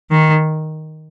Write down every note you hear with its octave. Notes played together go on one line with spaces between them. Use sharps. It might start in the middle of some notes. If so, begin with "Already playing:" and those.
D#3